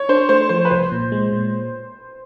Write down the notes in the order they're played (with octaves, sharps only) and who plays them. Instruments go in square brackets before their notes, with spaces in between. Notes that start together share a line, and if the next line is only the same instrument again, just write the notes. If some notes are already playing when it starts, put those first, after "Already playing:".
Already playing: [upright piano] C#5
[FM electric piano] D4 [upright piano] C5
[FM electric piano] A3 [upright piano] C5
[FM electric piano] F3 [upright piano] C5
[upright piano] B4
[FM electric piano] C2 [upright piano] C5
[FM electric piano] A#2
G#3
A#2